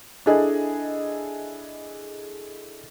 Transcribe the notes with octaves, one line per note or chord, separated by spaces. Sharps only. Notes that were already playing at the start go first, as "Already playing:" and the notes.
D4 E4 G#4 A4 D#5